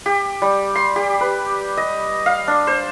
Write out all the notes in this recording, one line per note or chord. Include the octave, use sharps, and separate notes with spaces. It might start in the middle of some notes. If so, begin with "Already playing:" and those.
G4
G3
C6
G4
B4
D#5
F5
D4
C5